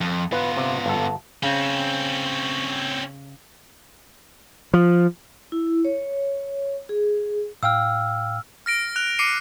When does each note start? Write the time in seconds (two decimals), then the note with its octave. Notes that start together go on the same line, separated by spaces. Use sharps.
0.01 F2
0.32 B3 F4 B4
0.57 C3
0.86 G1 A4
1.43 C#3 C4 C#4
4.73 F3
5.52 E4
5.85 C#5
6.89 G#4
7.63 A2 F5 G5 E6 F6
8.66 F6 A#6 D7
8.96 F#6 F7
9.19 D6 C7 C#7 D#7